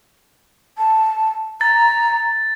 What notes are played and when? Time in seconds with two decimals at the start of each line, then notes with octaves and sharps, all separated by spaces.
0.78 A5
1.61 A#5 A6